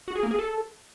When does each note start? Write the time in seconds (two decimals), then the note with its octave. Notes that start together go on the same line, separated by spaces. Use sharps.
0.08 F#4
0.15 G#4
0.23 A#3
0.31 G#4
0.39 A4